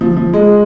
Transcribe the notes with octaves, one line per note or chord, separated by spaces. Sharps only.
F3
F3
G#3